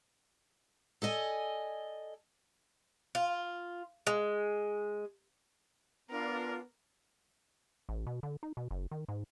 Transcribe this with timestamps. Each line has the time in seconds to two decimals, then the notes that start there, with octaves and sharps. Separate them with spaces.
1.02 A4 D5 D#5 G#5
3.15 F4
4.07 G#3
6.10 B3 D4 F4 A#4
7.89 A1
8.07 B2
8.23 D3
8.43 D#4
8.57 B2
8.71 F#1
8.91 D#3
9.08 G#2